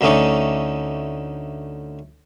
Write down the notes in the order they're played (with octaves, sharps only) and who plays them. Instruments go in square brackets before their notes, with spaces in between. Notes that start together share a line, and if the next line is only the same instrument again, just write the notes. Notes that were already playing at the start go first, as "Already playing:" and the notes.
[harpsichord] D2 D3 A3 C#4 D#4 D5